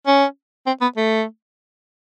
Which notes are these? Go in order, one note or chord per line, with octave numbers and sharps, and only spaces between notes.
C#4
C4
B3
A3